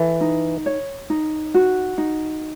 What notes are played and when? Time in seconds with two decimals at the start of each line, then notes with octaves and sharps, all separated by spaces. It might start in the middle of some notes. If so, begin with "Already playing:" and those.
Already playing: E3 A4
0.21 D#4
0.66 C#5
1.10 D#4
1.54 F#4
1.98 D#4